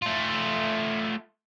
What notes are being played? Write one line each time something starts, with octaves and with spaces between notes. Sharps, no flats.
A3 F4